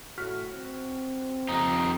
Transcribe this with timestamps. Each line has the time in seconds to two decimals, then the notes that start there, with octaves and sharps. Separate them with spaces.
0.18 A2 F#4 F6 B6
0.54 C4
1.49 F2 D#4 A#5